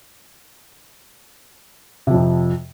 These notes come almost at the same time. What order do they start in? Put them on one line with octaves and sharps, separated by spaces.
C3 F3 F2